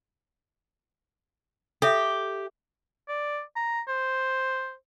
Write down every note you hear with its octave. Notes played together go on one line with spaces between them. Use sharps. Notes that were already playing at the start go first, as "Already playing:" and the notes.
G4 A4 E5
D5
A#5
C5